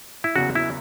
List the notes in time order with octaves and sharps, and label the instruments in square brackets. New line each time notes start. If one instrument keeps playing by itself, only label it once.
[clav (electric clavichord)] E4
[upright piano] F#1 E2 C#3 F#3 [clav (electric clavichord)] F#4
[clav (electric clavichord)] E4